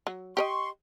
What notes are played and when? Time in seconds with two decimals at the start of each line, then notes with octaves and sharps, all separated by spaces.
0.07 F#3
0.37 G4 C#5 D#5 C6 C#6